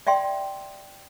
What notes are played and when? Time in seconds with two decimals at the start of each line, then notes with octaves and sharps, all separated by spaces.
0.07 D5 E5 G5 C6